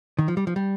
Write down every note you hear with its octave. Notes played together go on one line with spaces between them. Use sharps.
D#3
F3
G3
F3
G3